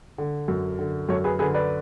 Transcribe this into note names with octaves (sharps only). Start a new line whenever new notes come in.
D3
F#2
D3
F#2 A4 C#5
G#4 B4
D3 G#4 B4
B4 D5